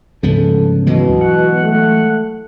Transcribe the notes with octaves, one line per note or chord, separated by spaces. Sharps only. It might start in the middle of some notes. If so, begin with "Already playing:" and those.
D2 G#2 C#3 F3 B3 A4
B2 E3 F#3 G#3
F#5
A3